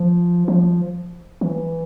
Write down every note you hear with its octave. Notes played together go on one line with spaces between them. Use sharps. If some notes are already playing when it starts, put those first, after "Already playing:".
Already playing: F3
F3
E3